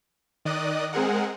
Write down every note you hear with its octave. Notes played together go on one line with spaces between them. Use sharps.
D#3 D5 D#5 D#6 F#6
G#3 C4 G#4 A#4 F#5